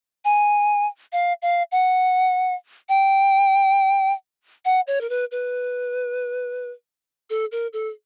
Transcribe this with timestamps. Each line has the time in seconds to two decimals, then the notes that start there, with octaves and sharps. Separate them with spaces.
0.25 G#5
1.13 F5
1.42 F5
1.72 F#5
2.89 G5
4.65 F#5
4.87 C#5
5.01 A#4
5.10 B4
5.32 B4
7.30 A4
7.52 A#4
7.73 A4